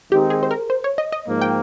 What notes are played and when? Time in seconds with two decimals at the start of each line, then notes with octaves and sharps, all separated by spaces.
0.11 D#3 G#3 C4 D#4 G4
0.30 G#4
0.43 C5
0.51 A#4
0.70 C5
0.84 C#5
0.98 D#5
1.12 D#5
1.27 G#2 F3 A#3
1.41 G5